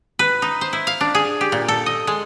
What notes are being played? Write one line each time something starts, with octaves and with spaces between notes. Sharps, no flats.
B4
D#4
C5
E4
F5
D4
G#4
G4
A#2
A4
D#5
G#3